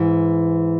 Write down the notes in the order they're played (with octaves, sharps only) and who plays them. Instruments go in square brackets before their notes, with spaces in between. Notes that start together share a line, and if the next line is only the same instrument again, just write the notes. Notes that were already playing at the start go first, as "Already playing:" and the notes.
Already playing: [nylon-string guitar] G#2 E3